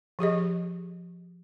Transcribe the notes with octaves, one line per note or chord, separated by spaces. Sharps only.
F3 G4 G#4 D#5